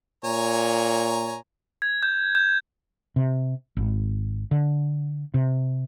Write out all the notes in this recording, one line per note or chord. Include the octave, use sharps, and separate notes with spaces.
A#2 C#5 G#5 A#5
G#6
G6
G6
C3
G#1
D3
C3